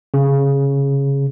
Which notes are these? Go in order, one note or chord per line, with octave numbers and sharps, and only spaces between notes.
C#3